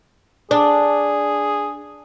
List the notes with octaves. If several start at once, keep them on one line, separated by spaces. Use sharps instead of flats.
D4 G#4